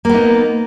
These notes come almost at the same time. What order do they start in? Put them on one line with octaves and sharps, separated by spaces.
A#3 B3 D#4